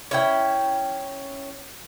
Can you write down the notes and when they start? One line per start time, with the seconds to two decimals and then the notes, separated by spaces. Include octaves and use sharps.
0.11 C#4 E4 G5